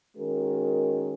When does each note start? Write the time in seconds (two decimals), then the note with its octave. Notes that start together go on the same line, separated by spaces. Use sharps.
0.16 D#3 G#3 C#4 F#4 A#4